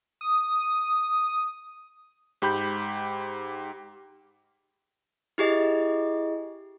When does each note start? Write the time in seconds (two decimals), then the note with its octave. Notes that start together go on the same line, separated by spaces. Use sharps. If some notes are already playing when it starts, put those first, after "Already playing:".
0.21 D#6
2.42 G#2 G4 B5 G6
5.38 E4 G4 G#4 D#5